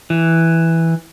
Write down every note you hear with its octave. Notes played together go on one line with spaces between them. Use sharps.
E3